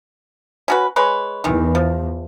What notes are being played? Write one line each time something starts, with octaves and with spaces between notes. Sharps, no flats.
C#4 F#4 B4
G#3 B4 C#5
E2 D#3 E3
F3